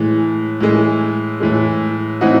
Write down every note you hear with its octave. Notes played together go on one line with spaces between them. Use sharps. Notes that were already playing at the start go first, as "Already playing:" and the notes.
Already playing: A2 E3 G#3
A2 E3 G#3
A2 E3 G#3
A2 E3 C4 D#4 F#4